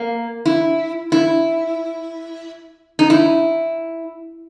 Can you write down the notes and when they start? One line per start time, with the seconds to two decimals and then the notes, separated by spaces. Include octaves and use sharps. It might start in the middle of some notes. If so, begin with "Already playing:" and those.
Already playing: A#3
0.46 E4
1.12 E4
2.99 D#4
3.10 E4